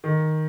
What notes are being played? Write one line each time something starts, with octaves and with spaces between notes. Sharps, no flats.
D#3